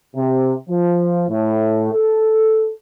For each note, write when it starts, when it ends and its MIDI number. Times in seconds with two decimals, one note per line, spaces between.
0.16 0.54 48
0.69 1.25 53
1.29 1.93 45
1.93 2.71 69